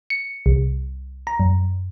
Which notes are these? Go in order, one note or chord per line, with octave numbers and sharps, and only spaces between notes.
C#7
C2
A#5
F#2